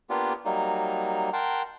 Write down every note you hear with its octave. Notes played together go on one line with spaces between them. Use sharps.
A#3 B3 D4 F4 G4
F#3 G3 A#3 D#4
A#4 F#5 G5 A5 C6